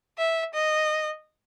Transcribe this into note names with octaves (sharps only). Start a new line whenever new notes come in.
E5
D#5